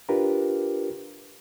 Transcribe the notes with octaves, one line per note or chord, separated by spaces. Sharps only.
D4 F4 G4 A#4 B4